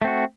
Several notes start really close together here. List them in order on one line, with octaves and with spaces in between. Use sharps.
A3 C4 F#4